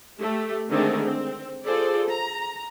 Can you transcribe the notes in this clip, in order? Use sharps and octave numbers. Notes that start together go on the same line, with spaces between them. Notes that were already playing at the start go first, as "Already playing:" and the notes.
A3 G4
D3 D#3 G#3 A3 C4 G#4
C4
F4 G#4 A4 C5 D5
A#5